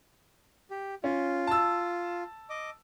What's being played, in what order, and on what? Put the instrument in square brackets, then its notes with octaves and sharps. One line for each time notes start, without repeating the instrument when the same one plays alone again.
[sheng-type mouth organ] G4
[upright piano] C#4 [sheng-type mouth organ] F4
[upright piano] A5 E6
[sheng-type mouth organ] D#5 D6